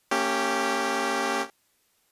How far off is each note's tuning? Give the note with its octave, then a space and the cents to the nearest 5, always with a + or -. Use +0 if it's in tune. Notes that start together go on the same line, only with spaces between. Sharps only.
A#3 -40 C#4 -5 G4 +0